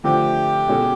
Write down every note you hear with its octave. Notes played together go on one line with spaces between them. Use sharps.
D3 F3 A3 C4 G4
B2 G#3 C#4 F#4 A4